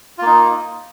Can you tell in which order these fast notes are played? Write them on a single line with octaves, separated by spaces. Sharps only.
F4 A#3 D#4